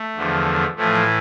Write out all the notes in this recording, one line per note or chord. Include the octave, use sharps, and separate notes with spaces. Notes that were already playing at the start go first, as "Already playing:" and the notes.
Already playing: A3
E2 D3 F3
A2 E3 F3 A3